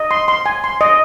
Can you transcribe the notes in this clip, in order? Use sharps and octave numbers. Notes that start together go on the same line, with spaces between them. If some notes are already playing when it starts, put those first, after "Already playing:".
Already playing: D#5
C6
C6
G#5
C6
D#5